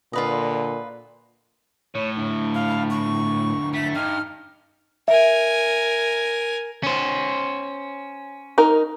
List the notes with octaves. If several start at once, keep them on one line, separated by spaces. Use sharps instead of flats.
A#2 D3 F4 B4 D#5
A2 C#5
D3 E4
F5
C#6
A3 B6
G2 D#4 F6
A#4 E5 G#5
C#4 C5
D#4 A#4